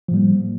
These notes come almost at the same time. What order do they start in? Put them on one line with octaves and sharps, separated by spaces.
F3 A2 G3 A#3